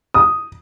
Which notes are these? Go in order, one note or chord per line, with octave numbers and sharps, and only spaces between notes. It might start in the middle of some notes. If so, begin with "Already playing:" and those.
D#6